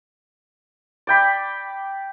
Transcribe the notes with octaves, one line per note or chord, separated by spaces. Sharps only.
D5 G5 B5 D6